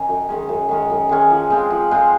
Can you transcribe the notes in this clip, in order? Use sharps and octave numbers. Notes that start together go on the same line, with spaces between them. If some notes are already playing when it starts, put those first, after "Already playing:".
Already playing: D#3 C#4
F#2
D#3 G#3 C#4
F#2
D#3 G#3 C#4
F#2
D#3 G#3 C#4
F3
G#3 C4 F4
F3
G#3 C4 F4